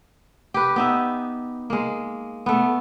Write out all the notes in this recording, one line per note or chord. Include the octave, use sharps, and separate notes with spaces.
G4 B4
B3 D#4 E5
G#3 A#3
A3 B3